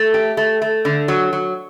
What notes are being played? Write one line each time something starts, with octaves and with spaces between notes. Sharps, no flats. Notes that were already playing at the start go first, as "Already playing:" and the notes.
Already playing: A3
G4
A3
A3
D3
F#3
F#3